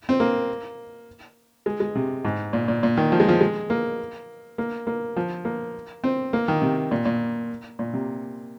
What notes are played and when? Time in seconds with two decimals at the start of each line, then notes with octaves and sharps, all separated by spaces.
0.09 C4
0.20 A#3
1.66 G#3
1.80 G#3
1.95 C3
2.25 G#2
2.53 A#2
2.68 A#2
2.83 A#2
2.97 D#3
3.12 F3
3.20 G#3
3.28 F3
3.41 G#3
3.70 A#3
4.58 A#3
4.87 A#3
5.17 F3
5.45 A#3
6.04 C4
6.33 A#3
6.48 D#3
6.62 C3
6.91 A#2
7.05 A#2
7.79 A#2
7.93 C3